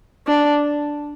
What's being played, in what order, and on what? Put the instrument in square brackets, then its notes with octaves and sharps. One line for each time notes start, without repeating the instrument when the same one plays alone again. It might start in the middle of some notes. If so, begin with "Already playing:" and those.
[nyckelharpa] D4